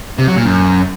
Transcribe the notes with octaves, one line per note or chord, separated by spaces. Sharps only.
C3
F#3
A#2
F#2